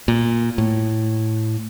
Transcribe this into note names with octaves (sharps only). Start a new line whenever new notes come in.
A#2
A2